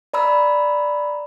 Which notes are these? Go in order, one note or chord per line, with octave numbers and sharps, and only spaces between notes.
D5 A#5 B5 E6